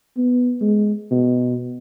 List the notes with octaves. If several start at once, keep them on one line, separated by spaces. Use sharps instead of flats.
B3
G#3
B2